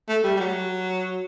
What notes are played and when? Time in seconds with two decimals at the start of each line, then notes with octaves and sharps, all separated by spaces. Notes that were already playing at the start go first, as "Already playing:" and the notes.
0.09 A3
0.24 G3
0.36 G3
0.40 F#3